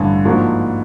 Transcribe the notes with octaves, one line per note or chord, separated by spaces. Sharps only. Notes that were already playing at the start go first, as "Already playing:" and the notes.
Already playing: A1 G2 D3
G#2 F3 A#3 D4 F#4